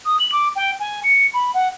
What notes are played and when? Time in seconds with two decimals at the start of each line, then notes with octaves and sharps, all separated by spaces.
0.05 D#6
0.20 F#7
0.32 D6
0.56 G5
0.80 G#5
1.04 C#7
1.34 B5
1.54 F#5